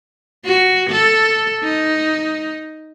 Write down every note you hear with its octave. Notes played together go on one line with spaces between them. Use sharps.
F#4
A4
D#4